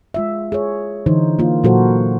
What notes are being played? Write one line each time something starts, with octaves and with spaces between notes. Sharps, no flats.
G#3 F4 E5
G#4 C#5
D3 E3 D#4 C5
A#3 F4
A#2 F#3 F#4 A4 A#4 C5